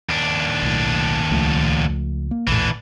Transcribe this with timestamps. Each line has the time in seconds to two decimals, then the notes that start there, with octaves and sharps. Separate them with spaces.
0.09 D#2 D4
0.62 B1 A2
1.31 C#2 F3 A3
2.31 A#3
2.47 A#1 E2 A2 E3 D4